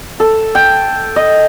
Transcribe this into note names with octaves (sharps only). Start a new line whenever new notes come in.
A4
G5
D#5